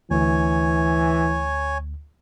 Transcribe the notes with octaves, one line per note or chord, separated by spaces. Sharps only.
D2 E3 C#5 G#5